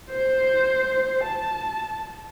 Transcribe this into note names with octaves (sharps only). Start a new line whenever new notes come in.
C5
A5